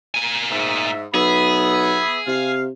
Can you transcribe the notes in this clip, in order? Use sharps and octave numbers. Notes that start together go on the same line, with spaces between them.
A#2 G#5
G#2 E5
B1 B3 G#4 E5 B5
C3 F5